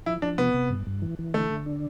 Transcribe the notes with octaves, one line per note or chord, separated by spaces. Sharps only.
F3 E4
F3 D4
C3 B3
C3
G2
G2
E3
E3
D3 A3
D3
D4